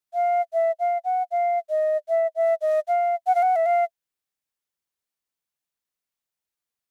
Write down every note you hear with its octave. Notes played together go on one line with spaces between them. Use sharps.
F5
E5
F5
F#5
F5
D#5
E5
E5
D#5
F5
F#5
F5
F#5
E5
F5